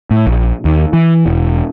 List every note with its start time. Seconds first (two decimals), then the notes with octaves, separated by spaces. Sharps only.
0.11 A2
0.27 A#1
0.65 D#2
0.93 E3
1.26 E1